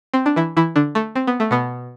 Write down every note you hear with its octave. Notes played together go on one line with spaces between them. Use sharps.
C4
D4
E3 E4
E3 E4
D3 D4
A3
C4
B3
A3
B2 B3